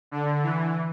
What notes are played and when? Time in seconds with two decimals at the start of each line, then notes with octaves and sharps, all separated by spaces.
0.11 D3
0.43 E3